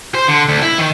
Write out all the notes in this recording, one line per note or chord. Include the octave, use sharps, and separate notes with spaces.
C5
D3
D2
E4
D#3